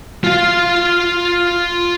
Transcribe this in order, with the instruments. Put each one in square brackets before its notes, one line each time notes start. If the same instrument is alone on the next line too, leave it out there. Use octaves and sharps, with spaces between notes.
[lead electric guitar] F4 F5